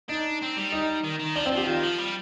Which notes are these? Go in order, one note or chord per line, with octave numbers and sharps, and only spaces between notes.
D4 D#4
C4
G3
D#4
D#3
D#3
F3 D4
C4
F3
G4
D#3 F4
F3
G3